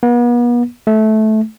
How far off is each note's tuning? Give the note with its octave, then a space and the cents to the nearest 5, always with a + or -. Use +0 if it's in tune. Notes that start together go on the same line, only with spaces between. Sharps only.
B3 -40
A3 -15